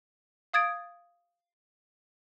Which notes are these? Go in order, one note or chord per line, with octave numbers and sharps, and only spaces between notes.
F5 D#6 G#6 A6 D7